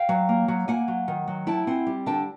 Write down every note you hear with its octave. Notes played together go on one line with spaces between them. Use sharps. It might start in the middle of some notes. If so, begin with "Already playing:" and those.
Already playing: F5 G5
F#3
A#3
F#3
A#3 F#5 G#5
F#3
D#3
F#3
E4 G5 A5
C4 F#5 G#5
G3
D3 G5 A5